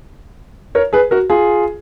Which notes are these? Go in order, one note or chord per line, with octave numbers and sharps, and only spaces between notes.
A#4 C#5
G#4 B4
F#4 A#4
F4 G#4